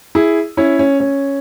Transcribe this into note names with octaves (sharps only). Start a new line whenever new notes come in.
E4 G#4
C#4 E4
C#4
C#4